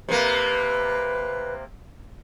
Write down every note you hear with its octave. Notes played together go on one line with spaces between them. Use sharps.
C3 A#3 B4